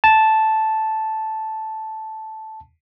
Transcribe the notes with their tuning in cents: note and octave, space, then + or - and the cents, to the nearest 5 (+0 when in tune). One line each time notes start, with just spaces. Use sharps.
A5 -5